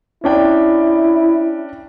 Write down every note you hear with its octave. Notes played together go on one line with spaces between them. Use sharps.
C#4 D4 E4 G5